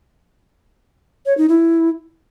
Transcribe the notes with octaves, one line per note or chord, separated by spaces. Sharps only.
C#5
D#4
E4